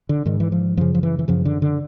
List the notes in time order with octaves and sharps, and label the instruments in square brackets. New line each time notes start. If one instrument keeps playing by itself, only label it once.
[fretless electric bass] D3
G#2 D#3
E3
F3
F#2 C#3 F3
F3
E3
E3
F#2 C#3 F3
D3
D3